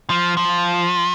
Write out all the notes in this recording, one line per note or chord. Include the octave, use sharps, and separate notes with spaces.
F3
F3